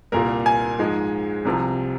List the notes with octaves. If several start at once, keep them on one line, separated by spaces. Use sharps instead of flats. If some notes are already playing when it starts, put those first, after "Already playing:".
C2 A#2 A#3 A#4
G#5
G#2 F3 G#3
C2 C3 F3